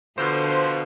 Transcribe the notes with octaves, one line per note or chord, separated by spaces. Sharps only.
B2 D3 F3 C5